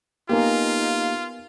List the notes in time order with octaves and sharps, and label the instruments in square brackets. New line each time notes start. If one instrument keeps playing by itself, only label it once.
[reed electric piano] A#3 G4 [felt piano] B3 A#4 G#5 [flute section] D#4 F5 [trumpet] F4